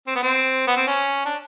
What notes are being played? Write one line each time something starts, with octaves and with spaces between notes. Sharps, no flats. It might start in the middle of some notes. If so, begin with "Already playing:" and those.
C4
B3
C4
B3
C4
C#4
D4